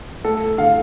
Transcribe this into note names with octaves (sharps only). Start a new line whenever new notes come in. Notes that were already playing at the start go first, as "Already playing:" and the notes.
A3 A4
D3 F5